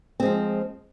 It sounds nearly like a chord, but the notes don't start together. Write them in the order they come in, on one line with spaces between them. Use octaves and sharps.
C4 G#3 F3